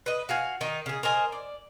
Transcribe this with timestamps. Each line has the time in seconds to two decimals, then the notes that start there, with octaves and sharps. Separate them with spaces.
0.06 B4 D#5
0.29 F#4 F5 G#5
0.61 D#3 D#4
0.86 C#3 G#4
1.03 A#4 C5 D#5 G#5
1.32 D5